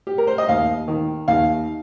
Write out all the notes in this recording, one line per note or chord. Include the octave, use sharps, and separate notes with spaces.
G4
A#4
C5
D#5
D#2 F5
D#3
D#2 F5